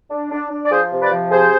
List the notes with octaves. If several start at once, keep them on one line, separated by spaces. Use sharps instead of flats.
D4
D4
D4
D5
F3 G#4 C5
C3
B4 D5
F3
C3 G#4 C5